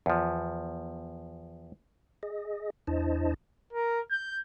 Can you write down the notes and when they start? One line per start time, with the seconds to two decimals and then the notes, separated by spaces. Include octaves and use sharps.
0.06 E2 F3
2.23 G#4 D#5
2.87 E2 D4 E4 C5 D#5 A5
3.73 A#4
4.11 G6